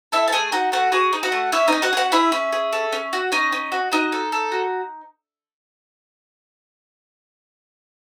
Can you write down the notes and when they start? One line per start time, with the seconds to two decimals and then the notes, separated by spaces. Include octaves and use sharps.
0.12 E4 A4 E5
0.28 A5
0.32 A3 G#4 G#5
0.52 D#4 F#4 F#5
0.72 A3 F#4 F#5
0.92 F#4 G#4 G#5
1.13 D#4
1.23 F#4 F#5
1.32 A3
1.52 C#4 E4 E5
1.68 C#4 D#4 D#5
1.82 F#4 F#5
1.93 G#4
1.97 F#4 F#5
2.12 E4 G#4 E5
2.32 C#4
2.52 G#4
2.73 A4
2.92 C#4
3.13 F#4
3.32 C#4 D#4 D#5
3.52 C#4
3.72 F#4
3.92 D#4 F#4 D#5
4.12 A4
4.32 A4
4.52 F#4